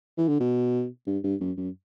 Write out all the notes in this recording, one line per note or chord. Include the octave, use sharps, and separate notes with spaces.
E3
D3
B2
G2
G2
F#2
F#2